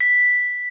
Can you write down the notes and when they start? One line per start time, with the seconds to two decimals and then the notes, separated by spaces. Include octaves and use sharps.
0.01 B6